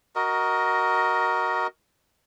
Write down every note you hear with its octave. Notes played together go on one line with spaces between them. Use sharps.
F#4 A#4 D#5